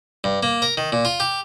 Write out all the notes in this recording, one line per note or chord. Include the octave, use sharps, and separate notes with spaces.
G2
A#3
A#4
D#3
A#2
F4
G4